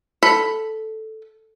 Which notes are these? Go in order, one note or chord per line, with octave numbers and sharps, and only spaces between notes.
A4 B5